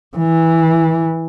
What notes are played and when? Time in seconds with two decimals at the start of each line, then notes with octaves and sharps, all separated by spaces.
0.17 E3